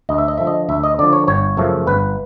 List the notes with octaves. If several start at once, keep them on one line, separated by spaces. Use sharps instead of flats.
D2 D#5
E5
D#5
D3 F3 E5
D#5
D2 E5
D#5
D3 F3 D5
C#5
G1 C#5
F#2 C#3 F3 A3
G1 B4